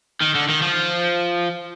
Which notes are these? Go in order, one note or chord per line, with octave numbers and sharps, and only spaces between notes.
D#3
D3
D#3
F3